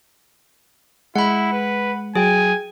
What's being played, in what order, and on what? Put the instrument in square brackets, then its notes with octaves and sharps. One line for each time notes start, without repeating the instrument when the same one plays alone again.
[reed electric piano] G#3 [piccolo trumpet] E4 [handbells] F#5 B5
[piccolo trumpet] B4
[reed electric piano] F#3 [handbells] G#4 G5 [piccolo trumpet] G#5